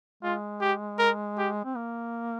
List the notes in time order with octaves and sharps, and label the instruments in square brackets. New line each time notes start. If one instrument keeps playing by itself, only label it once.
[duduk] G#3 [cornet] F4
[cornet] G4
A#4
G4
[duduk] C4
A#3